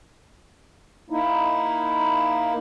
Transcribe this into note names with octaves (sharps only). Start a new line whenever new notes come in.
A#3 D#4 E4